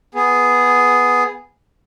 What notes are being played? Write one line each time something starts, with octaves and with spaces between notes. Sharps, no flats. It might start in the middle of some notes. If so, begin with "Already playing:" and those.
B3 G#4